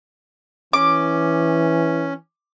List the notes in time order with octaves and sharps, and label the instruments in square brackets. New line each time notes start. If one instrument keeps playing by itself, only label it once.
[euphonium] E3 [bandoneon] C#4 [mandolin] D6